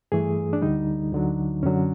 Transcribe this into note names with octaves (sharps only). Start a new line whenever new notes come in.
G2 E3 A3 G#4
D4
D2 D3 G3 D#4
D2 D3 F#3
F#2 D3 F#3 C#4